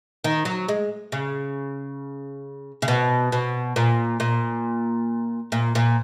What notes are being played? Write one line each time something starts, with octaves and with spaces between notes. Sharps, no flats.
D#3
F#3
G#3
C#3
C#3
B2
B2
A#2
A#2
A#2
A#2